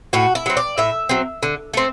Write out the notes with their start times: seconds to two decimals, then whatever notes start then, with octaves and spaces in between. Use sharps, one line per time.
0.13 A2 F#4
0.35 E4
0.46 F#3 C4
0.57 D5
0.78 A2 E5
1.09 F#3 C4
1.43 D3
1.74 A3 C4